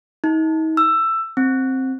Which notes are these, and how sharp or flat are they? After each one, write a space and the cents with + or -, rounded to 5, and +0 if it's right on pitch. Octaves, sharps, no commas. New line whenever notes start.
D#4 +40
E6 +15
C4 +10